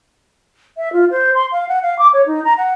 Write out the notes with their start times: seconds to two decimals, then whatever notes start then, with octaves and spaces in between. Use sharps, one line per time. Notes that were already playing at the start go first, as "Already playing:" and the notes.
0.77 E5
0.92 F4
1.11 C5
1.35 C6
1.52 F5
1.68 F#5
1.82 F5
1.98 D6
2.13 C#5
2.26 D#4
2.44 A#5
2.57 F#5